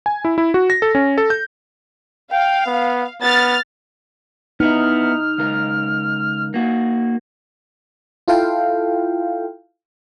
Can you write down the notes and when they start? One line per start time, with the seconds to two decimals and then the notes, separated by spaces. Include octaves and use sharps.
0.06 G#5
0.25 E4
0.38 E4
0.54 F#4
0.70 A#6
0.82 A4
0.95 C#4
1.18 A4
1.30 G6
2.32 F5 G5
2.67 B3
3.22 B3 F6 A6
4.60 B3 D#4 E4 F6
5.38 C#2 A#4
6.54 A#3 F#4
8.28 E4 F4 A4 F5 G5